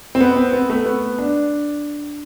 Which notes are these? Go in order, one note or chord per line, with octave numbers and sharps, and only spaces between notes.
C4
B3
C4
B3
A3
B3
D4